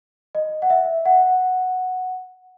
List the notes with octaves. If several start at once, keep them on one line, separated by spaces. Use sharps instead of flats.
D#5
F#5
E5
F#5